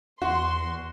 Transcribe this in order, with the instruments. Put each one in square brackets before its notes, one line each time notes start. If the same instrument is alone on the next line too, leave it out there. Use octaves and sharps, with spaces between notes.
[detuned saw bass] E2 [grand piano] F#4 [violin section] C6